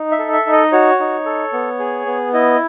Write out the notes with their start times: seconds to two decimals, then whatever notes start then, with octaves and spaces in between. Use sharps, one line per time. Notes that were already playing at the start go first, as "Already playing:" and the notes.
Already playing: D#4
0.12 E5
0.19 A4
0.32 E5
0.46 D#4
0.52 D#5
0.72 F#4 C#5
1.00 D#4
1.26 A4
1.53 B3
1.79 G#4
2.06 B3
2.33 E4 D#5